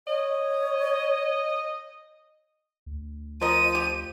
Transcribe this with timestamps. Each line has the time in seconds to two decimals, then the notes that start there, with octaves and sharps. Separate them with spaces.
0.07 C#5 D#5
2.86 D2
3.42 F3 A#4 D#5 D#7
3.75 G4